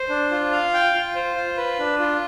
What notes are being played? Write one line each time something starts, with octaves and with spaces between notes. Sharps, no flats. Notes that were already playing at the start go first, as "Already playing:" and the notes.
Already playing: C5
D4
F4
F5
G5
F4
C5
F4
B4
D4
F4